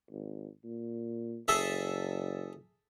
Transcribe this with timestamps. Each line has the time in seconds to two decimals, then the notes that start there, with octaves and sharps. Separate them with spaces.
0.11 G#1
0.64 A#2
1.48 F#1 G#4 A4 E5